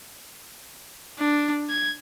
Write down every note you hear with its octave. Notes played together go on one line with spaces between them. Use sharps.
D4
G#6